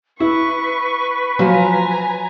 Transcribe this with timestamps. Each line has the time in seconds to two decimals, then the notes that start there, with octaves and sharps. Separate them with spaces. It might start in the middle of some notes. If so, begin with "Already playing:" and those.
0.20 E4 B4 C#6
1.39 F3 F#3 C5 G#5 A#5